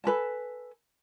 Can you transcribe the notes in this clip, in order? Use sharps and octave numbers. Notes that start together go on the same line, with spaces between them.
A4 B4 G#5 A5